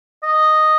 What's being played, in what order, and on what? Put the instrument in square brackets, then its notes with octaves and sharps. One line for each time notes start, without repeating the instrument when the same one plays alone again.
[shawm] D#5